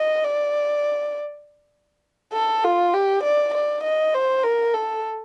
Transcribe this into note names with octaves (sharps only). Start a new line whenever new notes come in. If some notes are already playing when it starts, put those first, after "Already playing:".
Already playing: D#5
D5
A4
F4
G4
D5
D5
D#5
C5
A#4
A4